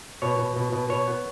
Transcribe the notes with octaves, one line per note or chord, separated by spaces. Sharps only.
B2 C#5
B2
B2
B2
B2 C#5
B3